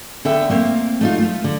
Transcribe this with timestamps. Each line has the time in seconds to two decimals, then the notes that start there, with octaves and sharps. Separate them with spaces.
0.25 D3 B3 A4 E5 G5
0.49 A3 A#3 C4
1.01 A3 D#4 F4
1.18 A3 F4
1.44 D3